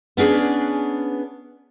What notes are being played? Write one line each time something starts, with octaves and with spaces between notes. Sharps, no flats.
B3 C#4 D4 G#4